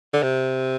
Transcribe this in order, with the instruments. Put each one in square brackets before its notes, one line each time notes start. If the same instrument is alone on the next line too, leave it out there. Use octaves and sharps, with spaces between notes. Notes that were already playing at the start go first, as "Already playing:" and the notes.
[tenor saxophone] D3
C3